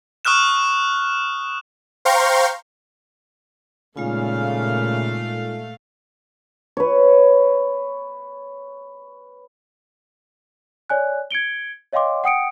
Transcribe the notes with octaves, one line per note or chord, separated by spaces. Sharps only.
C#6 D#6 F6 F#6 E7
C5 F5 G5 A#5 C6 C#6
A#2 C#3 G#3 A3 D#4 F4 F5
B4 C#5
C#5 D5 G#5 F#6
G#6 C#7 D7 G7
C#5 D#5 F5 G5 C6 D6
F#5 G5 D#6 C#7 D7